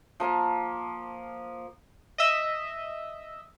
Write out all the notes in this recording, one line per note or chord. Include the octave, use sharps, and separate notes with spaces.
F3 A#3
D#5 E5